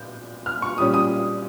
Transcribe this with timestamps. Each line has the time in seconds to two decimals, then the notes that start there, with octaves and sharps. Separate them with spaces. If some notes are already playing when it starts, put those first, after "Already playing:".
Already playing: A#2 G6
0.46 F6
0.62 C#6
0.78 A#2 G3 C#4 D#6
0.94 D#6